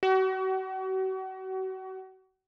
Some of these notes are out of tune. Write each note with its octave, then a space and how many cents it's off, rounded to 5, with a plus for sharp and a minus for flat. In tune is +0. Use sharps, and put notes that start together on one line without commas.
F#4 +35